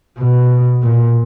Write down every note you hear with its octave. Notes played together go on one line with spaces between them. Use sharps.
B2
A#2